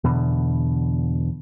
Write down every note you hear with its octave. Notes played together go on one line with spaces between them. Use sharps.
E2 B2 D3